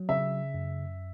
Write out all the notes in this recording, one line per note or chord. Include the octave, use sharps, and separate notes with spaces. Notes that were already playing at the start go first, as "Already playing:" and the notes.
Already playing: F#3
C#3 E5
F#2